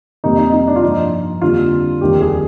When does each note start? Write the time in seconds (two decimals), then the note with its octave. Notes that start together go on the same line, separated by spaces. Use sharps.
0.24 F2 C3 G3 A#3 D#4
0.39 D#4
0.53 D#4
0.68 D4
0.76 F4
0.83 G2 F3 A#3 D#4
1.42 F2 D3 G3 A#3 F4
2.01 F1 D#2 D#3 G3 G4
2.21 G#4